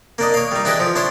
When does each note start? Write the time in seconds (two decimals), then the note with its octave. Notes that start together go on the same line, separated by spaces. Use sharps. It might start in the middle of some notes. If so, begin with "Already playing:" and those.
0.18 A#3 D4 D#5
0.34 C#5 F5
0.51 G3 D#4
0.65 D4 E4 G4 G#4 B4 D#5
0.79 F3
0.96 D4 E4 C5 C#5